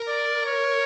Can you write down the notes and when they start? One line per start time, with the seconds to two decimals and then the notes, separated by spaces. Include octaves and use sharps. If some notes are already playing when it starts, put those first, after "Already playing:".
Already playing: A#4
0.08 D5
0.46 C#5